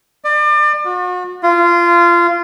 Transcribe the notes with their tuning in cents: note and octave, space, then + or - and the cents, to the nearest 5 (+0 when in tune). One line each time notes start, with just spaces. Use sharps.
D5 +35
F#4 -40
F4 -20